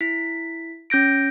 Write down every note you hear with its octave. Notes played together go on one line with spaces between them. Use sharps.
E4 B6
C#4 G6 A#6 D7